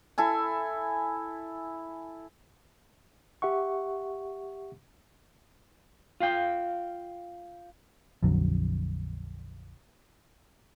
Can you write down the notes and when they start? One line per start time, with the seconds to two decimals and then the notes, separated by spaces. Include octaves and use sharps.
0.18 E4 A4 G#5
3.42 G4 E5 F#5 C#6
6.20 F4 F5 G5
8.22 A#1 F2 D3 F#3